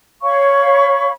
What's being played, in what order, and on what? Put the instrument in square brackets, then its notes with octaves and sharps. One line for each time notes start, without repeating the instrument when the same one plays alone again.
[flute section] C#5 F5 B5 C#6